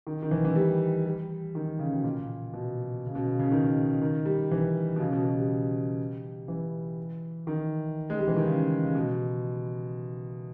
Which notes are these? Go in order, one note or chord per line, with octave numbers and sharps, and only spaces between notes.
D#3
D#3
E3
E3
G3
G3
D#3
C#3
B2
A#2
B2
C#3
B2
C#3
C#3
D#3
D#3
G3
E3
B2
C#3
B2
B2
G3
E3
D#3
G#3
G3
E3
D#3
C#3
C#3
B2